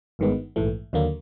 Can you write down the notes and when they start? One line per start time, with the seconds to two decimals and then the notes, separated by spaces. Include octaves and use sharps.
0.19 G1 G2 D#3 G#3 B3
0.56 A#1 G#2 E3 A3
0.93 D#2 D3 F#3 A#3